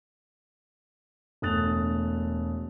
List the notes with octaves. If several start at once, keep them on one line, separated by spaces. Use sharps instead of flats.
E1 A3 D#6 F#6 A6 F7